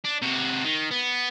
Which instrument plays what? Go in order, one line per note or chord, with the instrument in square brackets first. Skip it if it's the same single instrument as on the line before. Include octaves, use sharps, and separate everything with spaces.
[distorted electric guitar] D4
C3 F#4
D#3
B3